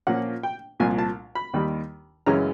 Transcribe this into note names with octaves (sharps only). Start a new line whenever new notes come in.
A#2 F3 A#3 C#4 F#5
G5
C2 A#2 F3 G#5
A5
B5
D#2 D#3 G3
F#2 C#3 E3 G#3 C#4 A#5